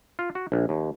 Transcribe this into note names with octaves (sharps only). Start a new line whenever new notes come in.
F4
F#4
A#1
D#2